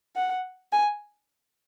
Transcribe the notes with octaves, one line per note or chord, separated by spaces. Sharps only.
F#5
G#5